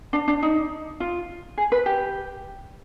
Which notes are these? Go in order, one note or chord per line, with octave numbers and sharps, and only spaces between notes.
D4
D4
D#4
F4
G#4
B4
G4